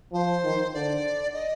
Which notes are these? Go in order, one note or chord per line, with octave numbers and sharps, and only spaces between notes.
F3 C5
D#3
D3 D5
D#5